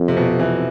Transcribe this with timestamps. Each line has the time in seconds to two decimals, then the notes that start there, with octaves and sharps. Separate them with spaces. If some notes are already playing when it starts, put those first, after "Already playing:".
Already playing: F2
0.08 C3
0.17 B2
0.40 E3